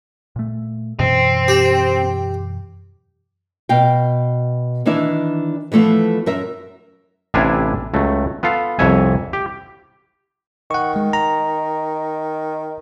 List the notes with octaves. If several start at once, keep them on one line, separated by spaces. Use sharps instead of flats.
A#2 A3
F#2 B2 E3 C4
G4
B2 F5 G5
D#3 E3 D4 E4 E5
E3 F3 A3 B3 F4
F#2 A#4 E5
A1 C3 D4 E4 F5 G#5
C#2 F#3 A3
B3 F4 A4 F5
C2 F2 C#5 E5 G#5
G4
D#3 F#5 C#6
G#3
A#5